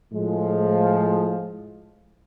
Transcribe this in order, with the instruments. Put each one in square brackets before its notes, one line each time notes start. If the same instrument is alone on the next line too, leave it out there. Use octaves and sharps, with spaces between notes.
[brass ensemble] A2 F3 G#3